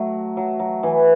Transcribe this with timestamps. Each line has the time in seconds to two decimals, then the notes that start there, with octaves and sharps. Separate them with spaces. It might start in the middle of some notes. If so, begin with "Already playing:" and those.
Already playing: F#3 A3
0.37 F#3
0.59 F#3
0.83 E3